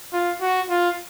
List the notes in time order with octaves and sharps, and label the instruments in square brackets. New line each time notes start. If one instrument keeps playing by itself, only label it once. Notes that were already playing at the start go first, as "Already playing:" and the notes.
[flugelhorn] F4
F#4
F4